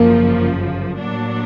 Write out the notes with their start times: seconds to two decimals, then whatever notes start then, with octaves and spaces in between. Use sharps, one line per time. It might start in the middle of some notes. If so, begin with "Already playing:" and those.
Already playing: G1 F#2 C#3 F3 A#3
0.98 A2 F#3 A#3 D4